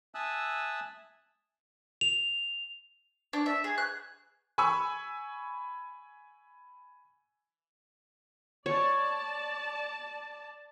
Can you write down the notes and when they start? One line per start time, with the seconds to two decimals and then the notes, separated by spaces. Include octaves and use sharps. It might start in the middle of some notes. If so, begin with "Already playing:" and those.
0.15 E5 G#5 A5 D#6 E6 F#6
2.01 F7
3.33 D4
3.46 E5
3.64 G#4
3.78 F#6
4.58 G#5 B5 C#6 E6
8.66 C#5 D5 A5